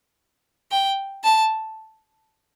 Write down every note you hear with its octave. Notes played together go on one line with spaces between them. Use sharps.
G5
A5